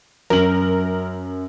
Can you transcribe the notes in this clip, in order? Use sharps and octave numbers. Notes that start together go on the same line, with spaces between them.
F#2 A#4 F#7